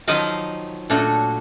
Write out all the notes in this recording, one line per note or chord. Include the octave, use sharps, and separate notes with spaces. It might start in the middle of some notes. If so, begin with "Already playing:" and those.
D#3 F3 F#3 D#5 F5
A#2 A3 D4 F#4